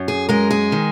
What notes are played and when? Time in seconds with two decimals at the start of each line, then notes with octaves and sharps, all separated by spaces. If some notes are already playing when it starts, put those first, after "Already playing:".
Already playing: F#2
0.08 G#4
0.29 G#3 A#4
0.51 G#4
0.72 D#3